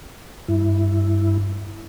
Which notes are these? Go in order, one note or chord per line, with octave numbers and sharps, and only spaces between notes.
G2 E4